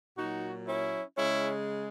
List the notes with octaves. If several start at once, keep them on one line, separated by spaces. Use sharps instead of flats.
A#2 F#3 D#4 F#4
C#4 E4
C#3 G#3 C#4 E4